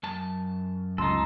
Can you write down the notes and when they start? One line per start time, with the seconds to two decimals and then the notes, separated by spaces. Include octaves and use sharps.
0.03 F#2 A5
0.98 C#2 D#4 A4 C6